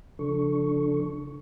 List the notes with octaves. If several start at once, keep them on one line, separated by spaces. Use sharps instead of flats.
C#3 F3 D4 A4 C#6